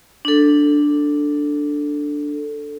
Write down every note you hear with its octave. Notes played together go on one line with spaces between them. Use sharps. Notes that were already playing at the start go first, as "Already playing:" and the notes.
D4 A4